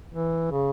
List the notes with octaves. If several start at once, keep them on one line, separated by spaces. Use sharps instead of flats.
E3
C#3